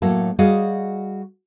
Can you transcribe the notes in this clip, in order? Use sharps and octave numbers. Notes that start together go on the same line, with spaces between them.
A2 F#3 A#3 A4
G3 F#4 G#4 D#5 F5 F#5